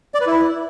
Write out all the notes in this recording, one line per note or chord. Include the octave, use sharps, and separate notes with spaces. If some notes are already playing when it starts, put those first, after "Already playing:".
D5
B4
E4